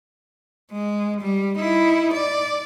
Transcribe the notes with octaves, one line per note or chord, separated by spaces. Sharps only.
G#3
G3
D#4 E4
D5